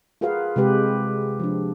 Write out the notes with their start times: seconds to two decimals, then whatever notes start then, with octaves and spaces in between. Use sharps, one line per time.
0.21 F4 F#4 G#4 A#4 B4 F5
0.56 C3 G#3 G4 B4
1.40 F3 D4